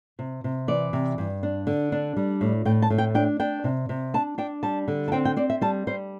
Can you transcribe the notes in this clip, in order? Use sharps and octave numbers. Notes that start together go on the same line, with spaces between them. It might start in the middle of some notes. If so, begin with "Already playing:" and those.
C3
C3
E3 D5
C3
G2
D4
D3
D4
G3
A2
A2 G5
A5
A2
G5
D4 G5
D4 G5
C3
C3
D4 A5
D4 G5
G3 A5
D3
A5
C4 G5
G5
C4 D5
E5
G3 A5
G3 C5